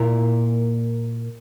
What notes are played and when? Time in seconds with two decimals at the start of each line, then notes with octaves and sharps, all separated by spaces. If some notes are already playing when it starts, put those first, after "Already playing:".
Already playing: A#2 A#3 E4 A#4